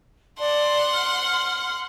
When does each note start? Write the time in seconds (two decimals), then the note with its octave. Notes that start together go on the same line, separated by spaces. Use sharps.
0.39 D5 F#5 A5 C6
0.93 F6